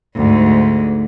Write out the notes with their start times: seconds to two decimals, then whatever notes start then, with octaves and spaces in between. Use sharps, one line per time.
0.16 D2 G#2